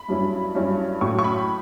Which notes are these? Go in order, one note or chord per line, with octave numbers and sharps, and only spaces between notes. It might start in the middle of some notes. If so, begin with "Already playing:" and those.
Already playing: B5
G2 F#3 C#4 E4
G2 F#3 C#4 E4
A2 F#3 C#4 C#6
C#6
B5